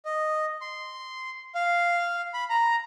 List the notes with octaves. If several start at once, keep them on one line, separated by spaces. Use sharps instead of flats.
D#5
C6
F5
B5
A#5